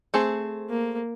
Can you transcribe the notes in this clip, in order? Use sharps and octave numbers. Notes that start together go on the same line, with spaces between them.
A3 C4 G#4
A#3